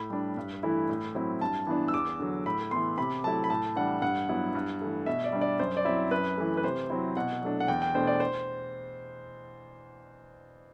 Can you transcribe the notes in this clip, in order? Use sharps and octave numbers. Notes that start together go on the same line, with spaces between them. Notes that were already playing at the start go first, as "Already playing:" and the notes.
Already playing: A2 B5
G3 D4
G2
E3 A3 E4
A2
F#3 C4 E4
G2 A5
E3 B3 D4
E6
E2 D6
D3 F#3
A2 B5
E3 B3 C6
C3 B5
F#3 A3 E4 A5
B5
A2 A5
E3 G3 D4 F#5
G2 F#5
F#3 B3 E4
G2
E3 A3
B2 E5
D5
G3 D4
D5
F#2 C5
D5
F#3 C4 E4 E5
F#2 B4
E3 A3
B4
C3 C5
F#3 C4 E4
B2 F#5
F#3 A3 D4
F#5
E2 G5
G5
B2 A3 D4 C5
D5
C5